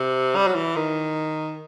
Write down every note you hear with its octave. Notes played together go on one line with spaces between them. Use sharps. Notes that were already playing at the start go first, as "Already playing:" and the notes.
Already playing: C3
G3
F#3
E3
D#3